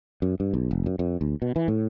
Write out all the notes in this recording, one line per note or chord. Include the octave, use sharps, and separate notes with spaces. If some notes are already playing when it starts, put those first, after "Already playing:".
F#2
G2
B1
F1
F#2
F2
D2
B2
E3
A2